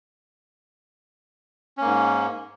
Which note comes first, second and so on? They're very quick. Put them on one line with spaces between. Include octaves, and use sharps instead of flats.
C#4 A#3 G#2